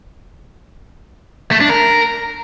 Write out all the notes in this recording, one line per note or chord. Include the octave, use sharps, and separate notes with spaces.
A3
D4
A#4